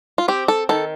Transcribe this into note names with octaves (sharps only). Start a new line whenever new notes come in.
F4
C4 G4
A4
D#3 A4